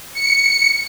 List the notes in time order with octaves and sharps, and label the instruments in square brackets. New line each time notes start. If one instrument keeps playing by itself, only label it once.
[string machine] C#7